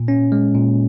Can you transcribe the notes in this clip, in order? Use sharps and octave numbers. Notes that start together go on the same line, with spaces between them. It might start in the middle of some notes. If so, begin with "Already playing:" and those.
Already playing: A#2
C#4
G#3
A#2